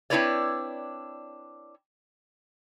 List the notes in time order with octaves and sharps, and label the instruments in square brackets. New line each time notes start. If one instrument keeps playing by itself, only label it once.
[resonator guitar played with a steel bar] C4 D4 E4 B4 C#5 D5